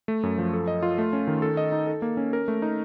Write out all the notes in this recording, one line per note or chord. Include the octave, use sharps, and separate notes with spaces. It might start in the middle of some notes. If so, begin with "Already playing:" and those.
A3
F#2
F3
A4
D#5
F4
A3
C#4
D#3
A4
D#5
D#4
A4
A#3
C#4
A#4
A3
D#4